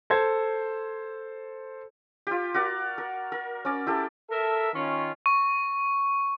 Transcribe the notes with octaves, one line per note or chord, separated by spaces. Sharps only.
A4 C5 G#6
F4 G4
F#4 A#4 D5
A#4
A#4
C#4 D5
E4 G4 A4
A4 A#4 E5
D#3 C#4 F4
C#6